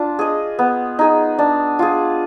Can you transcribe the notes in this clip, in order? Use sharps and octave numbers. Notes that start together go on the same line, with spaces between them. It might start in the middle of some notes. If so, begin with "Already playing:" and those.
Already playing: D4 F4
G#4 D#5
B3
D#4 G#4
D4
F4 G#4